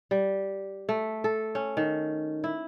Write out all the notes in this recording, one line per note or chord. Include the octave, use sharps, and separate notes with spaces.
G3
A3
A4
C#4
D#3
E4